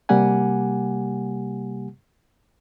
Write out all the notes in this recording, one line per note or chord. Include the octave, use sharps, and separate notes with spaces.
C3 G3 A#3 G4 F#5 G#5